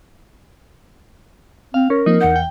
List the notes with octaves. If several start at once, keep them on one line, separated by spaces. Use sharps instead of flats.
C4 F5
C#4 A#4
F3 A#3 C4 D#4
E2 F#5 G6
G5